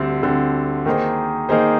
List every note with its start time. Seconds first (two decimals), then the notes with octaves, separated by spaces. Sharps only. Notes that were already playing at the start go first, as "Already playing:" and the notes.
Already playing: D2 D3 G3 C4
0.23 D2 D3 G3 C4
0.86 D#3 A#3 D#4 G#4 C5
1.49 D#3 A#3 D#4 G#4 C5